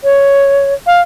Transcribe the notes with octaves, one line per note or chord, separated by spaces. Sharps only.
C#5
F5